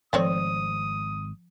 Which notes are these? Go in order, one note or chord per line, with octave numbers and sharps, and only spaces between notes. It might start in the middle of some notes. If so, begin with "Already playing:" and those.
G#1 F3 A3 C4 C#5 D5 D#6